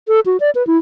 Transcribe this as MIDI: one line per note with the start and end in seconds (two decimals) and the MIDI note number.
0.08 0.20 69
0.26 0.37 66
0.40 0.50 74
0.55 0.65 71
0.67 0.77 64